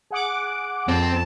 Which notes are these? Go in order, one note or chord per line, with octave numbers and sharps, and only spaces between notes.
G#4 F#5 D6
F2 C4 A5